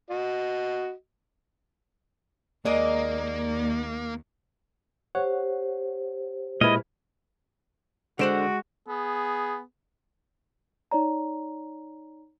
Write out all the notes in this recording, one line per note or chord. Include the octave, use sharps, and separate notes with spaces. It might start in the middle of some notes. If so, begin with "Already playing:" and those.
F#4 D#5
D#2 G#3 A#3 A#4 D5 D#5
G4 C5 C#5 F#5
A#2 G#3 E4 B4 D#5 F6
D3 G#3 F#4 C5 F#5 D7 E7
B3 G#4
D#4 C#5 D5 A#5